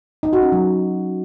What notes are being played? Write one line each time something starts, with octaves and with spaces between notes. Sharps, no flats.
D#4
F#4
C#4
F#3